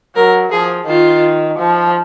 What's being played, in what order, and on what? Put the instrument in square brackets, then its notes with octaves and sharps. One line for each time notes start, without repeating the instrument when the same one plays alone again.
[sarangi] F#3 [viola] A#4
[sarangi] F3 [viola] G#4
[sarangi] D#3 [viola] F4
[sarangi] F3